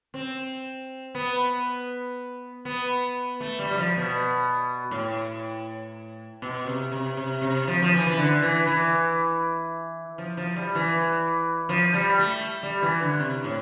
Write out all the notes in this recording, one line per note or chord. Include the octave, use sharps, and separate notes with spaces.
C4
B3
B3
A3
G3
G3
F3
B2
A2
B2
C3
C3
C3
C3
F3
F3
E3
E3
D3
E3
E3
F3
F3
G3
E3
F3
G3
A3
G3
E3
D3
C3
A2